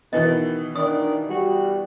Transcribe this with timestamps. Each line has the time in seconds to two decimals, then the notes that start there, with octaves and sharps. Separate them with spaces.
0.13 B2 D#3 E3 B3 D#5
0.76 D#3 D4 D#6
1.30 G3 F#4